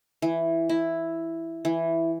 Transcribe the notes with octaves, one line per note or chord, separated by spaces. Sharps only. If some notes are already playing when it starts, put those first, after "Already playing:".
E3
E4
E3